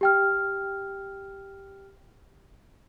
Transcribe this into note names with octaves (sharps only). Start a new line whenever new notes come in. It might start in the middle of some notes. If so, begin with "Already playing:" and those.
G4 G5 F6